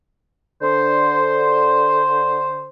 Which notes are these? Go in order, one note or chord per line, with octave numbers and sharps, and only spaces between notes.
D3 C5